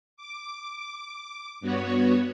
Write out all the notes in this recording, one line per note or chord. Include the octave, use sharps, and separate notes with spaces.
D6
G2 B3 F#4 C#5